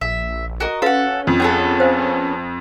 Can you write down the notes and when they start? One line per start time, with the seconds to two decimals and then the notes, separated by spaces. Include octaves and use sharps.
0.01 A#1 E5
0.60 F#4 A#4 D#5
0.82 C#4 F#4 A4 B4 F5 F#5
1.27 F2
1.40 B3 D4 G#4 A4
1.80 C5 F5 G#5